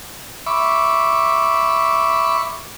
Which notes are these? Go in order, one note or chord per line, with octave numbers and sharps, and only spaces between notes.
E5 B5 C#6 D6